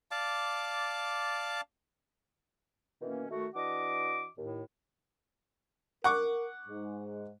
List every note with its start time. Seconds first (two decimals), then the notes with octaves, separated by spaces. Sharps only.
0.11 D5 F5 A5 D6
3.02 B2 D#3 E3 A#3 C#4
3.30 D#3 A3 F#4
3.55 E3 D4 F#4 D#5 D6
4.38 D#2 A2
6.04 A#4 F#5 C#6 D6
6.68 G#2